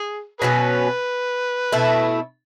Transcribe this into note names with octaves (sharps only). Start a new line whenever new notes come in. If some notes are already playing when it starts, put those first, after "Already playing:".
Already playing: G#4
B2 F#3 C#4 G#4 B4
B2 A3 E4